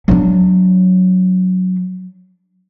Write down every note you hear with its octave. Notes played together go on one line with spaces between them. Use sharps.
F#3 D4